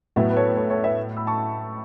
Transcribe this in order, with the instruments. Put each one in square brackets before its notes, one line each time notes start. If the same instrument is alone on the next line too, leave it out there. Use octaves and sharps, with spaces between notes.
[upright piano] A2 F#3 B3 E4 [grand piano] B4 E5
[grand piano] B4
A4 C#5
A4 C#5
A4 C#5
B4 E5
B5 E6
A5 C#6